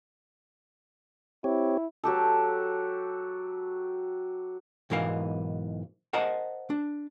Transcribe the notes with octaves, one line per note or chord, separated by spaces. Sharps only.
C4 E4 G4 C#5
F#3 F#4 G4 A4
B1 G#2 E3 A#4 F5
A#4 C5 D#5 F#5 A5 A#5
D4